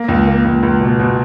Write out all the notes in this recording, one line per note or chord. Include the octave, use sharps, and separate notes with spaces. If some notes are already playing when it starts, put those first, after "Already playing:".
Already playing: A#3
C#2
A#3
C#2
C#2
B2
B2